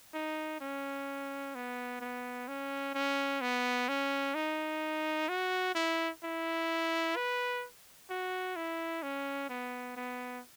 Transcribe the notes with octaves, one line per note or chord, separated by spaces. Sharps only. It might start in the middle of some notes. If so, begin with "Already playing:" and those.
D#4
C#4
B3
B3
C#4
C#4
B3
C#4
D#4
F#4
E4
E4
B4
F#4
E4
C#4
B3
B3